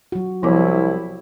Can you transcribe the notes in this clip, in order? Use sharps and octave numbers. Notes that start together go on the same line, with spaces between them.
F#3 F#4
C2 F3 B3 E4 C#5 D6